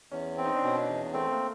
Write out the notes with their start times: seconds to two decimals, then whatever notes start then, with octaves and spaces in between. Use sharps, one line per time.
0.11 E2 C#4
0.37 C4
0.45 D#4
0.56 D4
0.63 B2 C#4
0.77 D4
0.88 E2
1.13 A3 C4
1.31 A#3